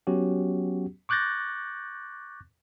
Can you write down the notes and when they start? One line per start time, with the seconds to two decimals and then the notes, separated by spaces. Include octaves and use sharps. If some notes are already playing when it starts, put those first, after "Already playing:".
0.07 F#3 B3 C#4 F#4 G4
1.09 C#6 D6 F#6 G6 A6 A#6